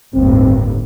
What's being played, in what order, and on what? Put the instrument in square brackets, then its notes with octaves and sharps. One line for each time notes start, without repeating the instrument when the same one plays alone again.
[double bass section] G1 D#2 A2 [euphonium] C4